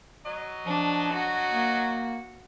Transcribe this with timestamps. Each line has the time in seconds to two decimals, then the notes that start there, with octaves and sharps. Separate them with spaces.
0.24 F#3 D#5
0.67 F3 D4
1.13 F#4
1.53 A#3